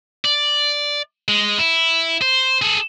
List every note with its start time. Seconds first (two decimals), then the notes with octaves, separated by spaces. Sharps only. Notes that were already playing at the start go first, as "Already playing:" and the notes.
0.25 D5
1.28 G#3
1.58 E4
2.22 C5
2.62 G#4 A4